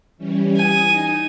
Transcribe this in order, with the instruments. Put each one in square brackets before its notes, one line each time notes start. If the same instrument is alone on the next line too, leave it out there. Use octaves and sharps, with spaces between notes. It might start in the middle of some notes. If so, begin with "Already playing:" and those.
[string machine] E3 G3 C#4
[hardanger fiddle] G#5 [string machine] D#6
[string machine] D#4